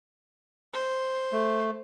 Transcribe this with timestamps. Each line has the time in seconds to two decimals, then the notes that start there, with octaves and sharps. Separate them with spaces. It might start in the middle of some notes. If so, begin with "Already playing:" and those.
0.73 C5
1.32 A3